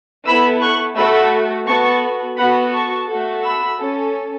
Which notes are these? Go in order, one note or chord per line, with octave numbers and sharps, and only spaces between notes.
B3 E4 A4 B5 E6
C#6 F#6
A3 F#4 A4 B5 E6
B3 F#4 A4 A5 C#6
B3 F#4 A4 F#5 B5
A5 C#6
A3 F#4 A4
B5 E6
C#4 A4